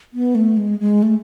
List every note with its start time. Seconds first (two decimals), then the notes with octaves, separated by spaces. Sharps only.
0.13 B3
0.35 A3
0.57 G#3
0.80 G#3
1.03 A3